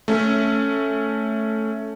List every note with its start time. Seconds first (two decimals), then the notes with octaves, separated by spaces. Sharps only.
0.08 A3 C#4